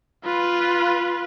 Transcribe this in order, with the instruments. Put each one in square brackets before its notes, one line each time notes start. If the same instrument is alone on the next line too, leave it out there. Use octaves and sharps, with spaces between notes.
[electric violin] F4 B4